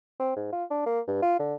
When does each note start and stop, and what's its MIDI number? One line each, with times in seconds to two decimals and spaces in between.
0.19 0.32 60
0.36 0.49 44
0.52 0.64 65
0.70 0.83 62
0.86 1.00 58
1.07 1.18 43
1.22 1.39 65
1.39 1.55 50